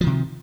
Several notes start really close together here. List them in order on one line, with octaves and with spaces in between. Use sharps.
F3 D#3 C3